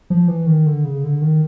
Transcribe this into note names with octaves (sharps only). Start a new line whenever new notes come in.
F3
E3
D#3
D3
C#3
D3
D#3